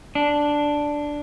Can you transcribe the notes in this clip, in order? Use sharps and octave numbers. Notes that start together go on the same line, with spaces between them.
D4